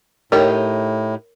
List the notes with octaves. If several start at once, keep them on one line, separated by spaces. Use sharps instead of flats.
A2 D#4 G4 A#4 C#5